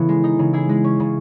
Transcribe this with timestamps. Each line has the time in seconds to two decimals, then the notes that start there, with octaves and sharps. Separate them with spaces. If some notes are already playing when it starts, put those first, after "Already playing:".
Already playing: C#3 E3 B3 A4
0.09 G#3
0.24 D#4
0.39 C#3
0.53 E4 G#4
0.69 G#3
0.84 C#4
1.00 C#3